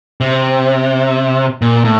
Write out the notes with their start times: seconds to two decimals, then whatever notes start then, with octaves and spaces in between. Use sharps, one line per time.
0.21 C3
1.62 A#2
1.85 A2